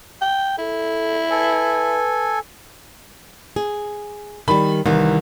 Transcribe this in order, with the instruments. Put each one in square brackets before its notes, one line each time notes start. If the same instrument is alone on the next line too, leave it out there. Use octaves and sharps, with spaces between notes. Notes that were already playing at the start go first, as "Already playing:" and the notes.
[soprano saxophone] G5
[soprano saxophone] E4 [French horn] A4
[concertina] A4 G#5 [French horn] B4
[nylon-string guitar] G#4
[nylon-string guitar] D#3 G3 [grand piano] B5
[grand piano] C2 [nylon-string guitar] D#3 E3